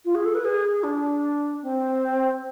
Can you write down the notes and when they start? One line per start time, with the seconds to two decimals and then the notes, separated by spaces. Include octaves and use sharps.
0.05 F4
0.15 G#4
0.25 A4
0.35 B4
0.44 G#4
0.83 D4
1.62 C4